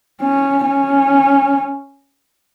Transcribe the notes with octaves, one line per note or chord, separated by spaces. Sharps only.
C#4
C#4